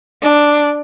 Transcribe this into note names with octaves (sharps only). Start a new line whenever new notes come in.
D4